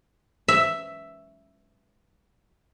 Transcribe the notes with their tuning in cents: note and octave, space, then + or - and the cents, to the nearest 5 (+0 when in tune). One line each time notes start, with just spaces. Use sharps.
E5 +5